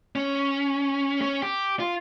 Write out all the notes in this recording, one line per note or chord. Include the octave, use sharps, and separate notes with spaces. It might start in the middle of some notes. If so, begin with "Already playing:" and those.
C#4
C#4
G4
F4